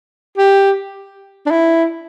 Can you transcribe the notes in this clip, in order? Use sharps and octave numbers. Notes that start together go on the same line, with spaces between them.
G4
D4
E4